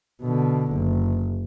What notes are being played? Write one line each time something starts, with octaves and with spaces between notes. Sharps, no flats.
B2 D3
F#1